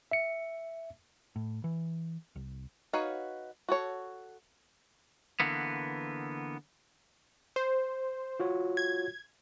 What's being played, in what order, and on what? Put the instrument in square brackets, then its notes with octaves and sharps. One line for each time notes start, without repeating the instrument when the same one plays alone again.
[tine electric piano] E5 C#7
[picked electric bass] A2
E3
C2
[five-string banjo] D#4 F#4 B4 C#5 F5
F#4 A4 C#5
[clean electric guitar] D3 E3 A#3 B3
[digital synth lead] C5
[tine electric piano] F4 F#4 C#5
[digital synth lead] G#6